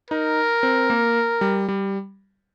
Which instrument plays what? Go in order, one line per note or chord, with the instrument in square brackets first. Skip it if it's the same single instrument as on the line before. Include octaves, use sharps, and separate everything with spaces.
[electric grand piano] D#4 [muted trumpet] A#4
[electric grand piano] C4
A#3
G3
G3